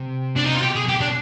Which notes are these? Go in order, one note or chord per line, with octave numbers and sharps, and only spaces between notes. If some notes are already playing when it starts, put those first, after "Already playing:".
Already playing: C3
D4
D#4
F4
B2 G4
G#4
G4
D4